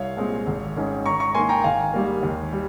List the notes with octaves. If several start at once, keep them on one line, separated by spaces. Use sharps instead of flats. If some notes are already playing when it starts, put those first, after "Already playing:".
Already playing: C2 C#5 F5
A#2 G#3 C4
G#1
G#2 D#3 G#3 C#4
G#2 A#5 C#6
A#5 C#6
D#3 A#3 G#5 C6
G5 A#5
G#1 F5 G#5
G#2 G3 A#3
D#2
G3